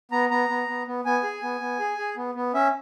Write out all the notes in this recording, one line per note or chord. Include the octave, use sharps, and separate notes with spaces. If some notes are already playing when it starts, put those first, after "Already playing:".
B3 A#5
B3 A#5
B3
B3
B3
B3 G#5
G#4
B3
B3
G#4
G#4
B3
B3
C#4 E5